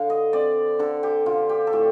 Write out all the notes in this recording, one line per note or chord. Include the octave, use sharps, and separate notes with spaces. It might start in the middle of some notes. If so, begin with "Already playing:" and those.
Already playing: D3 F5
D#5
C4 D5
D3 A4
G4
D3 F4
G4
A4
A2 G4